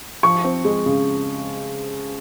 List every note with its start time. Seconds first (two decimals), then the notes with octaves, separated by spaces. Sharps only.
0.23 F3 C#6
0.44 C4
0.65 G#3
0.86 C#3